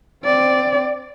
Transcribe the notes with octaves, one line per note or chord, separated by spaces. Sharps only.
C4 D5